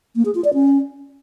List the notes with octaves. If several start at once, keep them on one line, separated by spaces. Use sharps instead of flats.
A#3
G#4
F4
D5
C#4